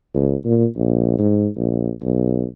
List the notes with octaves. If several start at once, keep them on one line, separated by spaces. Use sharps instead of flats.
C#2
A#2
A#1
G#2
A#1
B1